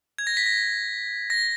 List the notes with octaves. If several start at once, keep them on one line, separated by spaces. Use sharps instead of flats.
G#6
A#6
B6
A#6
A#6